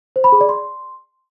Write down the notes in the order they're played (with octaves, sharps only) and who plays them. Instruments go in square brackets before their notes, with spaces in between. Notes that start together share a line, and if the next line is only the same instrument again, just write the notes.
[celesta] C5
B5
G#4
D5
C6